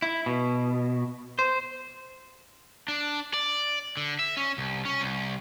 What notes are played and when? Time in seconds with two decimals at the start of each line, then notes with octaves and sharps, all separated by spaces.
0.02 E4
0.26 B2
1.39 C5
2.88 D4
3.34 D5
3.97 D3
4.19 E5
4.37 C#4
4.58 C2
4.85 C#4
5.01 C2